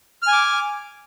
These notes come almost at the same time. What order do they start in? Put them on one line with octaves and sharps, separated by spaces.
F6 G#5 D6